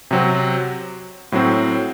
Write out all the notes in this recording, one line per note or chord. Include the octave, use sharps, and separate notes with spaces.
C3 F#3 C4
A2 F#3 C4